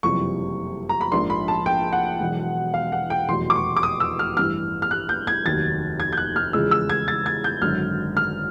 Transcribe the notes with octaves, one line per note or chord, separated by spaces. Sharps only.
F#1 F2 C3 E3 G3 C#6
A#5
B5
A#1 G#2 F3 A#3 D4 C6
B5
A5
G5
F#5
E1 E2 B2 F#3
F5
F#5
G5
F1 E2 B2 F#3 C6
D6
C#6
D6
D#6
E6
F6
A1 G2 E3 F6
F6
F#6
G6
G#6
F1 D#2 D#3 F#3 A6
G#6
G6
F#6
F6
E2 C#3 F3 G#3 E6
E6
G#6
A6
G#6
G6
G#1 F#2 D3 F6
F6